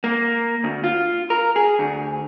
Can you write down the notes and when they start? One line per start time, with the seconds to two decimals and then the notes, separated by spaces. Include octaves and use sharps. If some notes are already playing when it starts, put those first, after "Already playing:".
0.04 A#3
0.64 D2
0.84 F4
1.30 A#4
1.56 G#4
1.79 D2